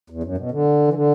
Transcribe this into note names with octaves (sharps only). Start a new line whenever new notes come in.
E2
F#2
B2
D3
E3
D3